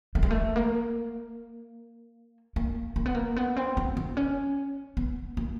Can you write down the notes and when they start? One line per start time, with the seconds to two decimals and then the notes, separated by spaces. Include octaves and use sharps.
0.15 A3
0.23 G#3
0.31 A3
0.56 A#3
2.56 A#3
2.96 A#3
3.06 B3
3.15 A#3
3.36 B3
3.57 C4
3.77 C4
3.97 C4
4.17 C#4
4.97 B3
5.37 A#3